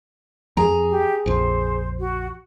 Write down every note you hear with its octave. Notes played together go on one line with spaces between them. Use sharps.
F2 G#4 G#5 A#5
G4
A#1 F2 C5
F#4